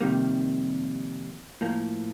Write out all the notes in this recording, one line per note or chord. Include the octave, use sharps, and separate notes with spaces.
F2 C3 D#3 G3 A#3
A2 F3 A#3